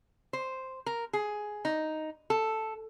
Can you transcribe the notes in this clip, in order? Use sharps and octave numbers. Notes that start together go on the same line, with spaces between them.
C5
A#4
G#4
D#4
A4